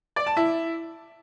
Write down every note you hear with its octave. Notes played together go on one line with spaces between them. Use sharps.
D5
A5
E4